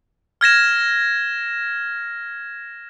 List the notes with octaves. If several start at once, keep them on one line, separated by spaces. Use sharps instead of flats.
F6 G#6 A#6 E7